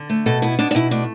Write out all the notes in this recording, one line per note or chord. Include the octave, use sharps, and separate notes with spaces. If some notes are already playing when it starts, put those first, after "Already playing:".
Already playing: D3
A3
B2 A4
B3 E4
B2 D4
D4
B2 E4
A3 D4